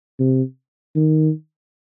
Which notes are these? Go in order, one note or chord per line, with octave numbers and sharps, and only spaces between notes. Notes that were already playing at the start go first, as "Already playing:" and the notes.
C3
D#3